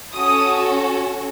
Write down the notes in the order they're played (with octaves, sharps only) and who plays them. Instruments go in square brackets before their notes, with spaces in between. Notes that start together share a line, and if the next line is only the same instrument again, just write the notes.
[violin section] C#4 F#4 A4 D#6